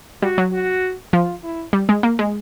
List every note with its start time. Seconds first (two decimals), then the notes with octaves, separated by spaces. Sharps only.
0.22 G3 F#4
0.38 F#3
0.52 F#4
1.13 F3 F4
1.43 E4
1.73 G3
1.89 G#3
2.03 A#3
2.19 G#3